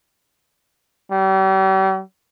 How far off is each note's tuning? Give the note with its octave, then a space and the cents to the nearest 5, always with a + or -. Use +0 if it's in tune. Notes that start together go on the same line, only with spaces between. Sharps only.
G3 -40